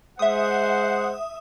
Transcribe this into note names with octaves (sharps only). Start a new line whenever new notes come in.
G#3 C5 E5 F#5 D#6